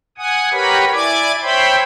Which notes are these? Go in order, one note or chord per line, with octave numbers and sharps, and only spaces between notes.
F#5 G#5 D#6
G4 A#4 B4 C#5 F#5 B5
E4 D5 G#5 D6 G#6
C5 C#5 E5 G5 B5 C6